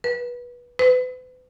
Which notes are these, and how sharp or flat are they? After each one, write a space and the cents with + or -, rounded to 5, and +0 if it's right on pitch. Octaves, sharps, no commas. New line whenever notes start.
B4 -20
B4 +40